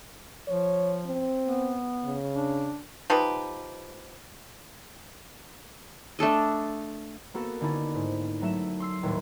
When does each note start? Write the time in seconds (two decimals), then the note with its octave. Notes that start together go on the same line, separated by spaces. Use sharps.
0.48 F3 C#5
1.06 C4
1.45 B3
2.05 C#3
2.34 D4
3.10 F3 D#4 G4 B4
6.19 A3 D4 A4 D#5
7.34 A#3 B3 F#4 A4
7.61 D3 C#4 D#4 E4 D5
7.95 G#2
8.42 F#3 A3 E5 E7
8.80 C6 E6 C7
9.03 D#1 D#2 A2